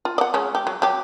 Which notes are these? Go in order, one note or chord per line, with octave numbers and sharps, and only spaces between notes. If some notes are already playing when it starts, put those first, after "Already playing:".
F4
D5 F#5
G#3 C#4
G4
F#3
F#3 G4